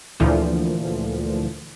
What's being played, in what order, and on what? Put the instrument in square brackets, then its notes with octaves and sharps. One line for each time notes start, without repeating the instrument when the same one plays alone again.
[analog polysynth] D2 A#2 D3 E3 F3